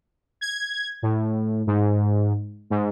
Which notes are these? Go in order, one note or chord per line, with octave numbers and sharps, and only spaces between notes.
G#6
A2
G#2
G#2